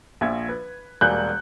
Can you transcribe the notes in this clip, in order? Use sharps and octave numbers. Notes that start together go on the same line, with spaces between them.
A#1 F3 E5 G#6
B4
E1 G3 A#3 G#5 F#6 G6